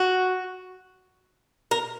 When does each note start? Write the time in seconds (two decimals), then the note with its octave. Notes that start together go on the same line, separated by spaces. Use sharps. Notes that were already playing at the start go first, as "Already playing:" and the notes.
Already playing: F#4
1.71 A#4